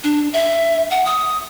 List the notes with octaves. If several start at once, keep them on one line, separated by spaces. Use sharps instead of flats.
D4
E5
F#5
D#6